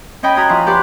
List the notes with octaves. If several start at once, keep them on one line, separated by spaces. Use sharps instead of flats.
C#4 C#5 D#5 G5 B5
F#4 D#5 G#5 A#5 B5
F3 E4 F4
G4 B4 D5 F#5 C6